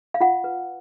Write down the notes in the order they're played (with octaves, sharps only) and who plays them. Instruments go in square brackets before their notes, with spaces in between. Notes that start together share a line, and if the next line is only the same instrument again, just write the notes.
[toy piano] F5
F4 F#5
B4